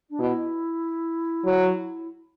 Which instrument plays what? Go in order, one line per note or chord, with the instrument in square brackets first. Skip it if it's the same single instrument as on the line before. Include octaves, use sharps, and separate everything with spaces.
[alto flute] D4
[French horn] B2 [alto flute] E4
[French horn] F#3